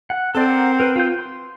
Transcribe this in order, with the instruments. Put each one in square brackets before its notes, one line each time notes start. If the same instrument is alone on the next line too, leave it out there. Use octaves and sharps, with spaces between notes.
[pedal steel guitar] F#5
[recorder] C4 [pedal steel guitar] A4 D5
[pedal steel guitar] A#4 F#5 D6
A#4 B4
F4 G6
C6